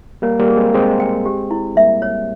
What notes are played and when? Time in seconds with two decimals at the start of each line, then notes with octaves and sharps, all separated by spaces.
0.22 G3 A#3 C#5
0.39 G3 A#3
0.48 G#4
0.57 G#3 C4
0.73 G#3 C4 G#4
1.00 G5
1.26 G4
1.51 E4
1.76 G3 A#3 E5
2.02 C#5